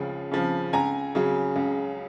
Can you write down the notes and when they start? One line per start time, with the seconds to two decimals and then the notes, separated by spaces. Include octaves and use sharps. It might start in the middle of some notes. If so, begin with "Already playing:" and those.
Already playing: C#2 C#3 F3
0.31 C#3 F3
0.73 C#2 G#5 A#5
1.15 C#3 F#3
1.56 C#2